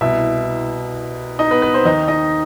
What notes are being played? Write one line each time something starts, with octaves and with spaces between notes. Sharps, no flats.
C2 B2 E4 E5
D#4 D#5
B3 B4
B3 B4
C4 C5
D#2 D#3 D#4 D#5
D#4 D#5